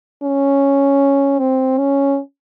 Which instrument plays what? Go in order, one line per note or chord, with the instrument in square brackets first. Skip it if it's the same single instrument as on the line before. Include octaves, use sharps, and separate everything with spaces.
[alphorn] C#4
C4
C#4